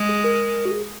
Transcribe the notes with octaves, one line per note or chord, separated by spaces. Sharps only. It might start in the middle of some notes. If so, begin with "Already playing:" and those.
Already playing: G#3
G#4
A#4
F#4
G#4